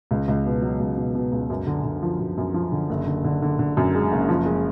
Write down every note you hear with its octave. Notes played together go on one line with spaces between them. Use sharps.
C#2
C#2
B2
F#3
C#2
B2
B2
C#2
F#2
D3
D3
F3
F#2
F#2
F3
D3
F#1
D3
D3
D3
D3
F#2
G#3
F#1
F3
G#3